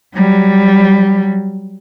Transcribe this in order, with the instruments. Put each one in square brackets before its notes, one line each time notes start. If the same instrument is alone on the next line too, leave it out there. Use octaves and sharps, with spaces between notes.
[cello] F#3 G3